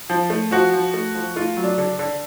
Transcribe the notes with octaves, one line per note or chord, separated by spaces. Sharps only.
F3
A3
F3 F#4
F3
A3
F3
A3 F4
F#3
D4
D3
D3